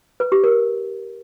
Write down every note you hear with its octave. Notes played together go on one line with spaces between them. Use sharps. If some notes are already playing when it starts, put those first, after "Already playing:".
B4
G4
A#4